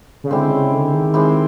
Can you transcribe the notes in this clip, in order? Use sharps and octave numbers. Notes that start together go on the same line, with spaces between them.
C#3
D3 G#3 C4 E4 G4
C#3
D3
D#3
G#3 C4 E4 G4